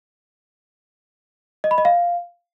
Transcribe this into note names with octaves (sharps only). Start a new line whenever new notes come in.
D#5
B5
D#5
F5